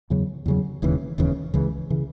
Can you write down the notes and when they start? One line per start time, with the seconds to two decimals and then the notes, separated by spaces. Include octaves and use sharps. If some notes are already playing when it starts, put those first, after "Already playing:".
0.10 E2 C#3 F#3
0.46 E2 C#3 F#3
0.82 E1 D#2 C#3 E3
1.18 E1 D#2 C#3 E3
1.54 C#2 C#3 E3
1.90 C#3 E3